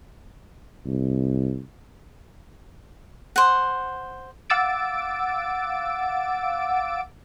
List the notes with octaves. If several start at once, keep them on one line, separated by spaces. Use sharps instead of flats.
C2
C5 F#5
F5 F#5 D6 E6 A6 D7